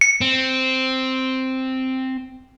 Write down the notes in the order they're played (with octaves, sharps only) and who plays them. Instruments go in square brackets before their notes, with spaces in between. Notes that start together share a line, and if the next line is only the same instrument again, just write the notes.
[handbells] C#7
[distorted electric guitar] C4